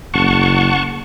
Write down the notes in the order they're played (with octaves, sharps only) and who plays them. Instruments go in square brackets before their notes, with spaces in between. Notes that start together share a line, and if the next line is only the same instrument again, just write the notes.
[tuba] F#1 [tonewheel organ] F#5 A5 C#6